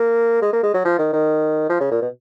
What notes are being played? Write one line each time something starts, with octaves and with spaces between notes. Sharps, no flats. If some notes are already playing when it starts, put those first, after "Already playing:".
Already playing: A#3
G#3
A#3
G#3
F#3
F3
D#3
D#3
F3
C#3
A#2
B2